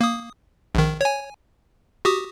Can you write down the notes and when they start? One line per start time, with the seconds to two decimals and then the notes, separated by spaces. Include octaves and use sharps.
0.01 A#3 D#6
0.75 A#1 D#3
1.01 C#5 G#5
2.05 F#4 G4 D#6